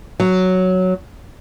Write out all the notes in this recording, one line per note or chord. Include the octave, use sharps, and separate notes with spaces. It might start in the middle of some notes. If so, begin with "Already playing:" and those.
F#3